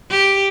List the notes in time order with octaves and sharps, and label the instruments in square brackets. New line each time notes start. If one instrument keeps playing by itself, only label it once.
[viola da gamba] G4